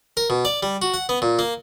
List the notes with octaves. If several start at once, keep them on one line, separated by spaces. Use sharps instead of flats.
A#4
B2
D5
G3
F#4
F#5
B3
A#2
A#3